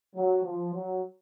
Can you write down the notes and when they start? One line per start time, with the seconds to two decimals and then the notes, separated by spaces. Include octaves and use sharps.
0.16 F#3
0.44 F3
0.74 F#3